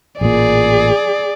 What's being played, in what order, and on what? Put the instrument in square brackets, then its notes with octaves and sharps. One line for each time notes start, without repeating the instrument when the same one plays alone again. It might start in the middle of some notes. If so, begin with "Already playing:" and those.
[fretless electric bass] A1 A#2 [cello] G#4 [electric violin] D5